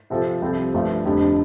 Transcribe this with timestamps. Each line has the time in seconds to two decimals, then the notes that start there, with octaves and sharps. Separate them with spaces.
0.10 C3 F3 C4 F4 A4
0.42 C2 C3 F3 C4 A4
0.74 G1 G2 F3 A3 F4
1.05 F1 F2 D3 G3 D4